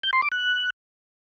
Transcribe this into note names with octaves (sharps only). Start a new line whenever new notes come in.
G6
C6
D6
F#6